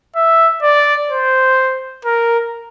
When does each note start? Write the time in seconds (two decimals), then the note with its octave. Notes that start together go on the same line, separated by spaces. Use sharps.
0.16 E5
0.63 D5
1.10 C5
2.05 A#4